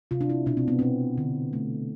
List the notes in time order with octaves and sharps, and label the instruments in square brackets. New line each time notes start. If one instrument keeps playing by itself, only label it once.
[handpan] C3 F4
D4
E4
B2 D4
C4
B3
B2 C4
D3
A3